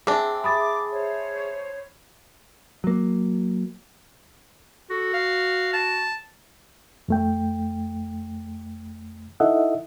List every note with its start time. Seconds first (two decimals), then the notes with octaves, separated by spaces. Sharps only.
0.07 C4 D4 G#4 E5 A5 D6
0.44 B5 D6 D#6 A6
0.92 C5 C#5
2.84 F#3 A#3
4.90 F#4 A4
5.13 F5
5.73 A5
7.08 F2 A3 G5
9.40 D#4 E4 A4 D#5 E5 F#5